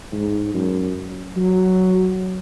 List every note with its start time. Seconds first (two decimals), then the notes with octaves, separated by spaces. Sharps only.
0.13 G#2
0.54 F#2
1.37 F#3